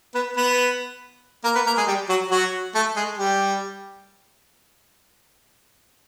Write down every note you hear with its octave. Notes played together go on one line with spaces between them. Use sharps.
B3 B4
B3 B4
A#3 A#4
B3 B4
A#3 A#4
G#3 G#4
G3 G4
F#3 F#4
F#3 F#4
A3 A4
G#3 G#4
G3 G4